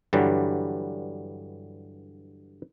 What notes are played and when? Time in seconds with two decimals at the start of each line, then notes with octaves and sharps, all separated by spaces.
0.13 G2 D3 E3 F#3 G3